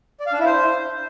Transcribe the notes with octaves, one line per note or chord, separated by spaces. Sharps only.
D5
F5
D4
E4
C5